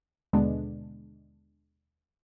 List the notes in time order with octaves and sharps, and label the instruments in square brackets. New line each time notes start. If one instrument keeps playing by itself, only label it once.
[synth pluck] D#2 B2 D3 G#3 B3 D4